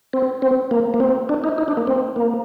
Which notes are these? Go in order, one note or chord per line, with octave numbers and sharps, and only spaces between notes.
C4
C4
A#3
A#3
C4
D4
D#4
D#4
D4
A#3
C4
A#3